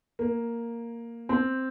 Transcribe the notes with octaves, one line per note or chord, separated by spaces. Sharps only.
A#3
C4